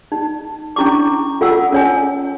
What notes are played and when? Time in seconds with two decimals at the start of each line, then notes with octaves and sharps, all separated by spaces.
0.12 D#4
0.76 C#4 D4 E4 C#6 D6
1.41 F4 A4 F#5 E6
1.72 C#4 C#5 G#5